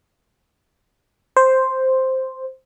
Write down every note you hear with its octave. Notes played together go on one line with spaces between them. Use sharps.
C5